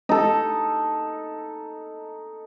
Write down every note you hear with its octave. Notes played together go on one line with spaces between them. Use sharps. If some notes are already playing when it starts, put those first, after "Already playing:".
D#4 A4